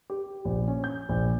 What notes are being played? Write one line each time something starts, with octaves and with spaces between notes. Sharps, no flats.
G4
A#1
C#4
G6
A#1